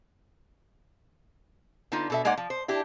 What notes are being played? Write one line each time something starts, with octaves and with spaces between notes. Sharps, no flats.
D3 B3 D#4 F4
B2 A4 E5
G#3 A#3 D#4 D5 F#5
F3
C5
D4 E4 G4